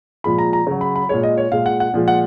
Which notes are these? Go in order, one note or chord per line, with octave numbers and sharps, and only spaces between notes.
A#2 F3 G#3 B5
A#5
A#5
C#3 F#3
B5
B5
A#2 G#3 C#5
D#5
C#5
A#2 G#3 F5
F#5
F#5
A#2 F3 G#3
F#5